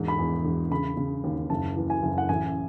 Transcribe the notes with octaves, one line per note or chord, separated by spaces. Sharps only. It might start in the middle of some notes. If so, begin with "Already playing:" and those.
Already playing: E1 G#2
B5
E2
E1
C#3 B5
C#3
D#2
F#1 A5
E3
G#5
F#1
F#5
A1 G#5